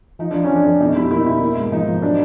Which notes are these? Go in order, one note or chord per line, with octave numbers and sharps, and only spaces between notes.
F3 D#4
F3 D4
C#4
F3
D4
F2
B2 D#4
G3 E4
A#3 E4
D#4
B2 E4
A#3
G#2
F3 D#4
F3
F#3 D4